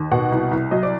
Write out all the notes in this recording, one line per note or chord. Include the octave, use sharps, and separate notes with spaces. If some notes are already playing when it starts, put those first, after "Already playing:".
Already playing: D#2
B2 F#5
C2
C2
F#3 D#5
D5